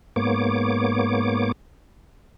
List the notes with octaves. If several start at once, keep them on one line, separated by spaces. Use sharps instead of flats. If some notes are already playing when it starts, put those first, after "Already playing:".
G#2 A#3 B3 C#5 D6